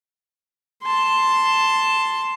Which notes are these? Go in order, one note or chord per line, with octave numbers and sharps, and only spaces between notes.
A5 C6